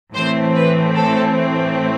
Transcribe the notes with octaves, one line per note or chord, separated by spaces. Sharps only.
A2 E3 A3 C4 C5
B4
A4